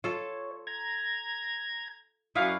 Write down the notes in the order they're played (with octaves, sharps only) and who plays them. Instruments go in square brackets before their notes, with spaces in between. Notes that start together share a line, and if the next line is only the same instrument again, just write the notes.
[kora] F4 A4 [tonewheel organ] C#5
[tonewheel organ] A#5 G#6
[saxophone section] F#2 F5 [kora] E4 B4 D5 [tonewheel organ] C#6 D#6